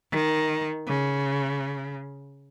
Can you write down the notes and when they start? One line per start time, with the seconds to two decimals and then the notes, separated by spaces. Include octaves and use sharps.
0.11 D#3
0.87 C#3